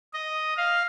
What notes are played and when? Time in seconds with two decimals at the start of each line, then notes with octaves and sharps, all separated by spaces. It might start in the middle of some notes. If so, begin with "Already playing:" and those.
0.14 D#5
0.57 F5